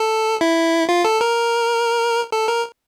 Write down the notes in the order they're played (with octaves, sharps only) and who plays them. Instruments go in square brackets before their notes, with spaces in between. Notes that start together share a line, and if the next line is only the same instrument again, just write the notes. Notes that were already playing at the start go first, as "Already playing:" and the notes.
Already playing: [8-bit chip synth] A4
E4
F4
A4
A#4
A4
A#4